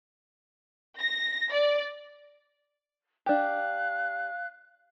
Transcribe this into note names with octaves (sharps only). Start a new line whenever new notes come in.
A#6
D5
D4 G4 F5 F#6